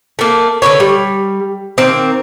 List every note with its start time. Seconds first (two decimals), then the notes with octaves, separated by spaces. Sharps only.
0.19 A3 A#3
0.62 D3 D#4 B4 C#5
0.80 G3
1.78 D#3 A#3 C4